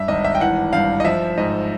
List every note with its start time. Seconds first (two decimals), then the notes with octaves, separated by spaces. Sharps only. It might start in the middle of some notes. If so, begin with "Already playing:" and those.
Already playing: G2 E5
0.08 G#1 D#5
0.25 E5
0.35 G5
0.40 E3 F#5
0.73 G2 F5
1.00 D#5
1.04 F3 E5
1.37 G#2 D#5